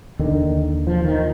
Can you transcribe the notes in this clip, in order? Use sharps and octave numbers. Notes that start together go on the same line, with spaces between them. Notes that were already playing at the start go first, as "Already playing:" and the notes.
D#2 D3 D#3
F3
D#3